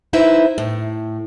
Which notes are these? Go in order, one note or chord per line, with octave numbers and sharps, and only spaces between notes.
D#4 E4 B4 C5 E5
A2